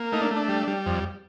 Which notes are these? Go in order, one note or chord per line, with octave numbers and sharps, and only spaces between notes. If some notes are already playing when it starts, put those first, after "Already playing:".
Already playing: A#3
A3 D#4
D4
A3
D4
G3
G3
F2